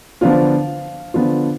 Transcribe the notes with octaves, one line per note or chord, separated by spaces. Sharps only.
D3 F3 B3 D4 F4 F5
D3 F3 B3 D4 F4